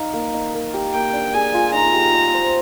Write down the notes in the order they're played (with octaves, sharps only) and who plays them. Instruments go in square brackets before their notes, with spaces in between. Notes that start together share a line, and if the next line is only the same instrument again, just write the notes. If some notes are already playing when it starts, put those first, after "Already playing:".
Already playing: [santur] D#4 F5
A#3
D#4
A#4
G4
[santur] A#3 [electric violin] G5
[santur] D4
[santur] G#4 [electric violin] G#5
[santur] F4
[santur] D#4 [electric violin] A#5
[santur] G4
D#5
C5